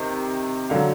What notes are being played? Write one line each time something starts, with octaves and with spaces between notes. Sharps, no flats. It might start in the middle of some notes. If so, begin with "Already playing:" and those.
Already playing: C3 D#3
D3 F#3 F5